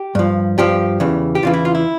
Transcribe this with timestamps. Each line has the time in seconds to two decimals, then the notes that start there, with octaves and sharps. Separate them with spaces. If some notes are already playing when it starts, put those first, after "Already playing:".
Already playing: G4
0.15 G2 F3
0.58 G2 F3 G4
1.00 E2 C#3 E3
1.35 G4
1.43 E2 C#3 E3 F4
1.54 E4
1.65 F4
1.75 E4